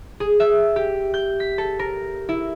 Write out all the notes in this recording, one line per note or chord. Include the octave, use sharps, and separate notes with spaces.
G#4
E5
G4
G6
B6
A4
A#4
E4